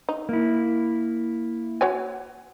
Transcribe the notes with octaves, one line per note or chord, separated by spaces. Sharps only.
D#4
A#3 E4
F#4 C#5 G#5